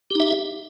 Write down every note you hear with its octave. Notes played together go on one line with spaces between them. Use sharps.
D#4 G4 E5